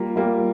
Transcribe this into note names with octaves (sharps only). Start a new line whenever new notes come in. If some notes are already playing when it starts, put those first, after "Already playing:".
Already playing: G3 A#3 F4
G3 A#3 F4